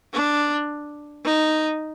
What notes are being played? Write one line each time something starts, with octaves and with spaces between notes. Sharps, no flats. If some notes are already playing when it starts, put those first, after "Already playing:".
D4
D#4